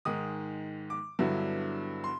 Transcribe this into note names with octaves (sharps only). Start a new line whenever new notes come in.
G#2 D#3 G#3 D#6
D6
G2 D3 F#3 B3 E4
C6